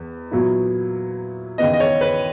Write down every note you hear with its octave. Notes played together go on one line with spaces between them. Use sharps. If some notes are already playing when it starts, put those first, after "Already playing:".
Already playing: E2
A#2 F#3 B3 E4
D#2 C#3 E3 B3 D#5
D#5
C#5
B4